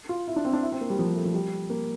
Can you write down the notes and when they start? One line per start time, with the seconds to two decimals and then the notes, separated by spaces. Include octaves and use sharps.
0.09 F4
0.28 E4
0.36 D4
0.45 C4
0.53 D4
0.63 E4
0.72 C4
0.81 A#3
0.90 G3
0.99 F3
1.08 G3
1.17 A3
1.25 F3
1.34 G3
1.70 A#3